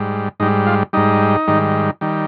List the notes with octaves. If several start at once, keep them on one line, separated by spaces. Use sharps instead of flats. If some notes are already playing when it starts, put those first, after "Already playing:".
Already playing: G#2 G3
G#2 G3 D#4
F4
G#2 G3 D#4
G#2 D#3 G3
D#3 G3